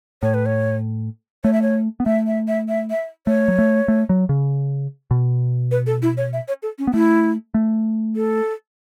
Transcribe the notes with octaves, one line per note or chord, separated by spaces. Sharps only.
A2 C#5
B4
C#5
A3 C#5
E5
C#5
B3
A3 E5
E5
E5
E5
E5
A3 C#5
F#3
A3
A3
F#3
C#3
B2
B4
A4
E4
C#5
E5
C#5
A4
C#4
B3
A3 E4
A3
A4